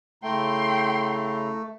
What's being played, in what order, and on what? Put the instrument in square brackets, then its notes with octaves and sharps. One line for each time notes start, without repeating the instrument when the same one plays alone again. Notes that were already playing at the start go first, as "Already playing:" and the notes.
[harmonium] C#3 E4 A#5 [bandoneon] A3 [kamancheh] G5 C6